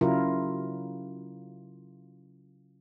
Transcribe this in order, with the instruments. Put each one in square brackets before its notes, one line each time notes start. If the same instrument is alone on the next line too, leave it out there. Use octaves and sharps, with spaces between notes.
[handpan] C#3 F#3 E4 F4 A#4